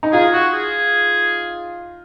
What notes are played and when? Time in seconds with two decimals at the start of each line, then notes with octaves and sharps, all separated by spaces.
0.03 D#4
0.13 F4 G#4
0.33 F#4
0.53 G#4